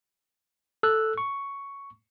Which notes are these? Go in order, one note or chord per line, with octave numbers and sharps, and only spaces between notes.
A4 E6 F#6
C#6